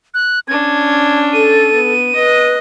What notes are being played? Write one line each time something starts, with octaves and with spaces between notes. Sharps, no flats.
F#6
C#4 D4 G#6
A4 D#7
B3
B4 D#5